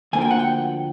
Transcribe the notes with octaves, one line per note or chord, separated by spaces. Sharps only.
D2 D3 F3 A#3 G#5
G5
F#5
G5